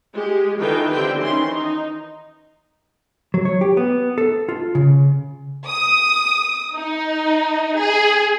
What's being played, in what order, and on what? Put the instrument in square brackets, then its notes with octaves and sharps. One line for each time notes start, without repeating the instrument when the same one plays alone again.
[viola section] G#3 G4
D#3 E3 F4 A4 B4 G5
D3 C4 E4 G4 G5
D#3 E3 C#4 C6
D#4
[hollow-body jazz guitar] F#3
C#5
G4
B3
A4
F4
C#3
[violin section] D#6
D#4
G#4